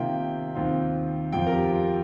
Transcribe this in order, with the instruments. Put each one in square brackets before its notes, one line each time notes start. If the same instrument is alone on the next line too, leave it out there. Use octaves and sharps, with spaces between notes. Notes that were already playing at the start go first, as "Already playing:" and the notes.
Already playing: [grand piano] C3 D#3 A#3 F4 G5
D#2 D#3 C4 F4
F2 F3 C4 F4 G5
A#4
G4
F4